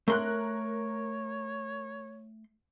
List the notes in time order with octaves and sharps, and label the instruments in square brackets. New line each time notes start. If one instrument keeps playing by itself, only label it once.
[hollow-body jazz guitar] A3 C6 [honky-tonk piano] A#4 F#6 [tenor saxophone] C#5